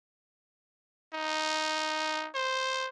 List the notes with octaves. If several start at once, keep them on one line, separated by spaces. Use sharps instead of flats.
D#4
C5